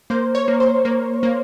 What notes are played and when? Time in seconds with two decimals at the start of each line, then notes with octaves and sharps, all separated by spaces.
0.10 A#3 C5
0.35 C#5
0.48 A#3
0.60 C5
0.85 A#3
1.23 A#3